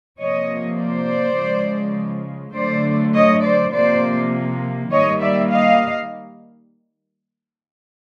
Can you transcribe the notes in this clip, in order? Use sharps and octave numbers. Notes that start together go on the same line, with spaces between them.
C3 F3 A#3 C#5 D#5
C5 D5
C#3 F3 G#3
D3 F#3 A3 C5 D5
C#5 D#5
C5 D5
C3 F3 A#3 C5 D5
D#3 G3 A#3 C#5 D#5
D5 E5
D#5 F5